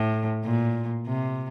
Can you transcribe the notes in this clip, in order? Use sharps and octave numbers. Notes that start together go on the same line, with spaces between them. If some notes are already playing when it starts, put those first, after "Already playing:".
Already playing: A2
A#2
C3